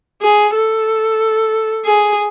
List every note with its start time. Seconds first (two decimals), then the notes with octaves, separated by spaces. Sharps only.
0.22 G#4
0.54 A4
1.86 G#4